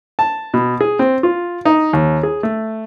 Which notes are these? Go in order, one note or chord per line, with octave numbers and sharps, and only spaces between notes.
A5
B2
G#4
C4
F4
D#4
D#2
G#4
A3